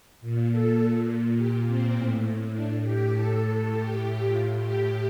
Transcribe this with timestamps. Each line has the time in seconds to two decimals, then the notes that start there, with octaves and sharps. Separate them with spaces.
0.21 A#2
0.51 A4
0.79 A#2
1.37 A#2 G4
1.67 C4
1.96 A2
2.54 A2 D4
2.83 G4
3.12 A2 A4
3.70 A2 G4
4.28 A2 F4
4.57 G4